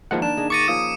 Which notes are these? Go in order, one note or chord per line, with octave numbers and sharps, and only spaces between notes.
D#3 F3 G#3 A#3 F#5
D4 E7
G#4 D#5
C#6 D6 A6 A#6 C#7 D#7
F3 A#3 C#4 D#6